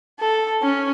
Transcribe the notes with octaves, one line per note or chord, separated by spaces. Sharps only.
A4
C#4